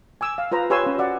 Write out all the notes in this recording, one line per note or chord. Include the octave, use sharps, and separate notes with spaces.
G#5 D6 E6
F5
F4 B4 C5 A#5
G4 B4 C#5 G#5 C6 E6
C#4 C5
F#4 D5 F#5